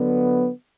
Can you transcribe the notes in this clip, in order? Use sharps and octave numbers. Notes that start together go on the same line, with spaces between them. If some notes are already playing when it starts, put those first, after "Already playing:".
Already playing: D3 F#3 B3